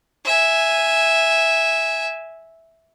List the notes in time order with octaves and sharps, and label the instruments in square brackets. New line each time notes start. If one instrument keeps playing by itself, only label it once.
[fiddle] E5 G#5